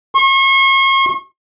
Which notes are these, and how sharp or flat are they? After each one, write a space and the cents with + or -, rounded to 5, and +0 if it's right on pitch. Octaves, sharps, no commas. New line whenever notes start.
C#6 -40